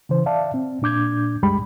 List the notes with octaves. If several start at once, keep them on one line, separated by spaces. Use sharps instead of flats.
C#3 E3 C5
D5 E5 F5 A5
C4
A#2 D4 D6 G6 G#6
C2 F#2 G3 G#3 B5